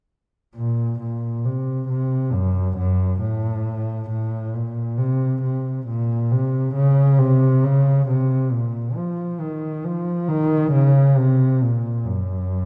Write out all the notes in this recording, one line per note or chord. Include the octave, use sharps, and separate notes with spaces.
A#2
A#2
C3
C3
F#2
F#2
A2
A2
A#2
C3
C3
A#2
C3
C#3
C3
C#3
C3
A#2
F3
D#3
F3
D#3
C#3
C3
A#2
F#2